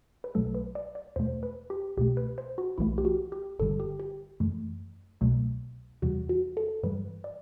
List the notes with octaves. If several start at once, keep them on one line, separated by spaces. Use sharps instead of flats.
B4
B1 B2 F#3 A3 A4
B4
D5
D5
E2 B2 A3 C5
B4
G4
C2 B2 A3 G4
B4
C5
F#4
B1 A2 E3 A3 E4
G4
F#4
G4
G1 G2 D3 G3 A4
G4
G4
F#2 E3 A3
C2 B2 F#3 A3
E2 C3 E3 G3 F#4
F#4
A4
G2 E3 G3 B4
D5